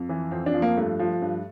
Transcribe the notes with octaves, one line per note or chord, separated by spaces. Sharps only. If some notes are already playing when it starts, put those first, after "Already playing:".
Already playing: F2
E3
F2 C4
D4
F3
A#3
G2 A3
F3
G2